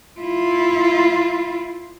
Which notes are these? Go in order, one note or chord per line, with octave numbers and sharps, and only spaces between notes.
E4 F4